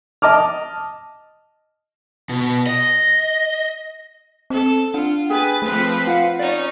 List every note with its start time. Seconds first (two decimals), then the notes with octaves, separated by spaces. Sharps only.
0.22 D#5 A5 D6 F6
2.29 B2
2.67 D#5
4.50 C4 A4
4.94 D4 F4 F#5
5.30 G4 G#4 B4 G5 G#5 A6
5.62 F3 A3 C4 B4
6.07 F4 F5 F#5
6.39 C#4 D#4 C#5 D5